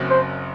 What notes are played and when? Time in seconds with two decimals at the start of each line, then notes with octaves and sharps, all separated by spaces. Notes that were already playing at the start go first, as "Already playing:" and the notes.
Already playing: F#1 F#2 F#3 C4
0.10 C5